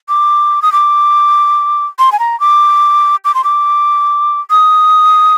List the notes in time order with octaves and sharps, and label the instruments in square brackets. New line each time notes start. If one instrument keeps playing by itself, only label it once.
[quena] D6
D#6
D6
C6
G#5
A#5
D6
D6
C6
D6
D#6